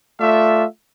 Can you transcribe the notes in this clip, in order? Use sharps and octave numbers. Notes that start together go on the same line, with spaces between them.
A3 F4 D5 E5